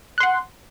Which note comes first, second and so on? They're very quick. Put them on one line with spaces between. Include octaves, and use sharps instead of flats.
F#6 C6 F#5